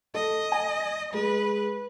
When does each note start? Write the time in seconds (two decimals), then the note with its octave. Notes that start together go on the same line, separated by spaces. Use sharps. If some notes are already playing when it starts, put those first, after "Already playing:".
0.14 A4 D#5
0.52 G#5
1.14 G#3 B4